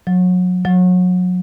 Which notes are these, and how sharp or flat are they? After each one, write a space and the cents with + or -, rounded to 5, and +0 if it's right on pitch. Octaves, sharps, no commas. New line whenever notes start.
F#3 -30
F#3 -30